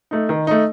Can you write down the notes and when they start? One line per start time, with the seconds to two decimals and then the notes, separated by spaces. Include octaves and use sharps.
0.11 A3 D#4
0.29 D#3
0.47 A3 D#4